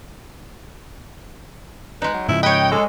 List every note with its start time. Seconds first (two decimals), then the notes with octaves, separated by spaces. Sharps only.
2.02 G#3 D#4 B4
2.14 F#3
2.29 G#2 C#3 F3 E4
2.43 B4 C#5 D#5 G5
2.72 G#3 A4